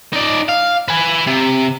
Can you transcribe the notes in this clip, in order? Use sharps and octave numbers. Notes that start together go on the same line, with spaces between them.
D#4 D5
F5
B4 G#5
C3